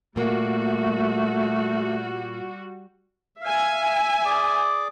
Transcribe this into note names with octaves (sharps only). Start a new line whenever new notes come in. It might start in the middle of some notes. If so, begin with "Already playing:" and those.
A#2 G3 A3 A#3 F#4
E5 F5 G#5
G#4 D5 D6